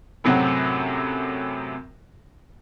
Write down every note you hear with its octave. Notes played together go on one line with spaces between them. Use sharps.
F#2 A2 C3 F#3 C4 F#4